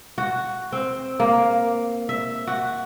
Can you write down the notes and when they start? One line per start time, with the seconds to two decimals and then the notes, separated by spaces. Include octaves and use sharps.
0.18 F#4
0.72 C4
1.20 A#3
2.09 E5
2.47 F#4